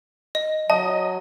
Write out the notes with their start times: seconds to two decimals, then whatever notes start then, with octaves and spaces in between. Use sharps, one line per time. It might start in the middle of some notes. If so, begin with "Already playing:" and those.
0.35 D#5
0.70 F#3 D#5 A5